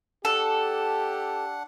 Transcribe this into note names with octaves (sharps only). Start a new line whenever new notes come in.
D4 G4 A4 F#5